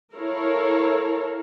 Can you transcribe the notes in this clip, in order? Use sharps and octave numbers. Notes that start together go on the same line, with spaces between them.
E4 A4 A#4 C#5 F5